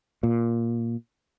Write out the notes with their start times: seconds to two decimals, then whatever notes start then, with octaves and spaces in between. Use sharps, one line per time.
0.23 A#2